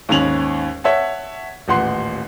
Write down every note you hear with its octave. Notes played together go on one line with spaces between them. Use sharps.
D#2 G#2 C#4 F7 F#7
C#5 E5 F#5 A5
D#1 A1 F#5 C6 C7